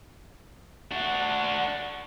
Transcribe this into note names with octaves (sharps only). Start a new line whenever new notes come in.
D4 F#4